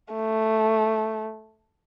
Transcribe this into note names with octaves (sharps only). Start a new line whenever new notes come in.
A3